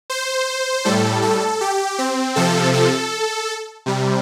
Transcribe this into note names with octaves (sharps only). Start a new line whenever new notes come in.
C5
A2 G3 A4
A4
G4
C4
C3 F3 A4
A4
C3 G3